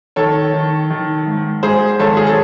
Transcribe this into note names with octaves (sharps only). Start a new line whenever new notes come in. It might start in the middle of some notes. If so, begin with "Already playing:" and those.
D#3 A4 C#5
D#3
D#3
G#2
G#2 G#4 C5
G#1 A4 C#5
G#4
A4